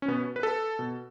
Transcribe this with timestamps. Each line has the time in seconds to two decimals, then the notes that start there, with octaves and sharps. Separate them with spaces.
0.02 C#4
0.08 B2 B3
0.36 B4
0.43 A4
0.79 B2